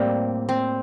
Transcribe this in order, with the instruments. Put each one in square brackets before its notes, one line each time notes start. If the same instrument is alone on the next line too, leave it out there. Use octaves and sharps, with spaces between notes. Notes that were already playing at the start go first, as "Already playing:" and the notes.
Already playing: [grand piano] A2 [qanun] G3 A#3 C4
[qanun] C4